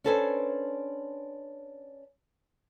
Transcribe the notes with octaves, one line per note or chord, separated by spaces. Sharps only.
C#4 D4 A4 B4 C5 G#5